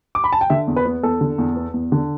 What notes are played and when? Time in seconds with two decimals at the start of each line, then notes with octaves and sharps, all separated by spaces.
0.15 D6
0.24 B5
0.32 A5
0.41 G5
0.50 D3 E5
0.67 E2
0.76 B4
0.86 B3
1.03 E2 A4
1.21 D3
1.38 E2
1.56 B3
1.74 E2
1.92 D3